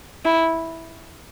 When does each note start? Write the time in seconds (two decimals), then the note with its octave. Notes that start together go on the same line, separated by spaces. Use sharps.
0.24 E4